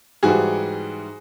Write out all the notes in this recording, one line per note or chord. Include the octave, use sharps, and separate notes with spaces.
G#2 E3 G3 F#4 G#4